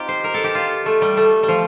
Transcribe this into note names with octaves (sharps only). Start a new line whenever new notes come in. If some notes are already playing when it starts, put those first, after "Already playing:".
Already playing: C4 D#4 F4 G4
C5
A#4
A4
G4
F4
A3
G3
A3
G3
F3